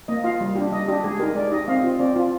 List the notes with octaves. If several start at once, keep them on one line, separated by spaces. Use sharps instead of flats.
A#3 D#5
F4 F5
G3
D4 G4
G3 D#5
D4 G4
G#3 G#4
D#4 G4 A#4
G#3 D5
D#4 G4 D#5
C4 F5
F4
C4 D5
F4